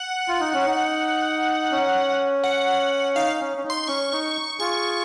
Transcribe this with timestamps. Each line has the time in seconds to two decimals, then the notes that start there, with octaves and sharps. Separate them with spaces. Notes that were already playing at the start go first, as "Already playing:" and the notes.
Already playing: F#5
0.28 F4
0.40 D#4
0.54 C#4
0.67 D#4
1.72 C#4
2.44 F#5
3.15 D#4 F5
3.40 C#4
3.57 C#4
3.64 D#4
3.70 C6
3.88 C#4 C#6
4.12 D#4
4.59 F4 G#4 C#6